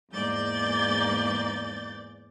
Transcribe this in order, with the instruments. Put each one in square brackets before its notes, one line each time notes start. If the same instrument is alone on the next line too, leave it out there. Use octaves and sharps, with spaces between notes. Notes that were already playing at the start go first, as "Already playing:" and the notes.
[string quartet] E2 G#2 A#3 D5 G6 A6